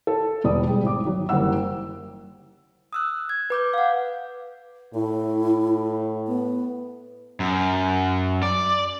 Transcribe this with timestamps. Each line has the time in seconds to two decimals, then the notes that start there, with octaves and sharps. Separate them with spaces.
0.07 A4
0.44 E1 B2 G3 D5 D#6
0.67 G3 G#3
0.83 G#1 D6
1.05 D#3 F#3
1.29 F#1 E3 G3 A#4 F#5 E6
2.93 D#6 E6 F#6
3.29 G#6
3.50 B4 D6 G6
3.74 F5 F#5
4.94 A2 E4
6.27 B3
7.40 F#2
8.43 D5